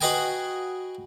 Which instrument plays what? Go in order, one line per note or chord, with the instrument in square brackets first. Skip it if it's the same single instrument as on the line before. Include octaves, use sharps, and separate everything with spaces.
[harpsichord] F#4 G#4 B4 D#5 G5 G#5